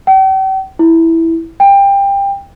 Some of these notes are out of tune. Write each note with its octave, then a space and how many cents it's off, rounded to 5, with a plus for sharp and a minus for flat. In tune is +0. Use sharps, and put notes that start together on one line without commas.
G5 -40
E4 -5
G5 +20